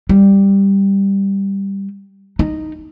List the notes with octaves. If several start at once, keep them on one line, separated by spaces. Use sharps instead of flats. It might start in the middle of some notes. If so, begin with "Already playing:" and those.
G3
D#4